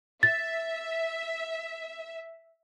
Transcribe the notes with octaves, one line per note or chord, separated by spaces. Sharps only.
E5 A6